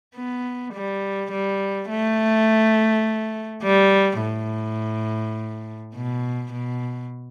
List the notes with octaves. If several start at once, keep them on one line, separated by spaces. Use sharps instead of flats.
B3
G3
G3
A3
G3
A2
B2
B2